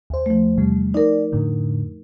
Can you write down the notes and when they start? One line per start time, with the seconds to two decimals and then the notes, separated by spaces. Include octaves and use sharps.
0.10 D#2 C5
0.26 F3 A3
0.57 E2 C3 G3
0.94 D#4 A#4 D5
1.32 F2 A2 D3